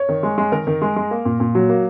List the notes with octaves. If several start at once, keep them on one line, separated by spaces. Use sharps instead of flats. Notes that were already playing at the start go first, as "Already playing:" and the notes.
Already playing: C#5
D#3
G#3
G#3
D#3 A#4
D#3
G#3
G#3
A#3
A#2
A#2
F#3
A#3